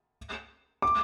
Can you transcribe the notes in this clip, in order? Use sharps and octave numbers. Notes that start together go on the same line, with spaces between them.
D6